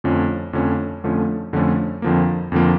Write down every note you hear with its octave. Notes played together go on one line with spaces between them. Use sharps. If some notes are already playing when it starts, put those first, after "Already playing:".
F2 D3 F3 A3 C#4
F2 D3 F3 A3 C#4
F2 D3 F3 A3 C#4
F2 D3 F3 A3 C#4
F2 D3 F3 A#3
F2 D3 F3 A#3